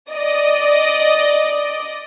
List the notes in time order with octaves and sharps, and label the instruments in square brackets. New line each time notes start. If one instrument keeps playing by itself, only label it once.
[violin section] D5 D#5